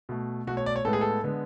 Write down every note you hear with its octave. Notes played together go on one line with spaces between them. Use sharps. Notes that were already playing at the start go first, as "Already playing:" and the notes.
B2 A3
B2 A3 F#4
C#5
D5
C#5
A2 G#3 B3 A4
G#4
A4
D3 G#3 B3